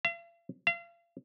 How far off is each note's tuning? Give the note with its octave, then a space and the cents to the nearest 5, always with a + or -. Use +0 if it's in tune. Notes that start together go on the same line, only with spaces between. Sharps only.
F5 -45
F5 -35